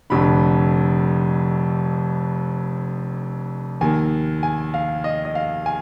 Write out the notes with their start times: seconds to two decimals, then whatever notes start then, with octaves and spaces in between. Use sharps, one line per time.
0.10 F1 F2 D3 B5
3.81 D#2 D#3 G#5
4.43 G#5
4.74 F5
5.04 D#5
5.25 D#5
5.35 F5
5.66 G#5